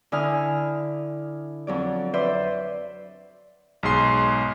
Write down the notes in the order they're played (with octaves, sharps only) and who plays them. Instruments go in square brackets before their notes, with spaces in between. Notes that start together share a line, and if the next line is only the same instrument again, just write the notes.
[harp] D3 E4 G#5 D#6 F6
F2 F#3 D5
B4 C5 D5 E5
[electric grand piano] B1 G#2 G#4 C6 C7